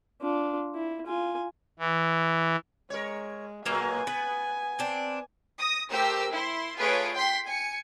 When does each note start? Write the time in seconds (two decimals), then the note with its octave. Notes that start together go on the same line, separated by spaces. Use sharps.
0.22 D4 F4
0.75 E4
1.06 F4 G#5
1.79 E3
2.90 G#3 A#4 C#5
3.66 A#2 F#3 G#3 A#3 F5 G#5
4.07 B3 B4
4.79 C4 D4
5.58 D#6 A#6
5.90 A3 G4 A#4 C5 G5 E6
6.32 E4 C6
6.76 A3 F4 G#4 B4 C#5 D7
7.15 G5 C6 B6
7.46 G#5 C#7